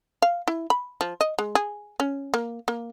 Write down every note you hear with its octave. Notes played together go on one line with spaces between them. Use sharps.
F5
E4
B5
F3
D#5
G#3
G#4
C#4
A#3
A#3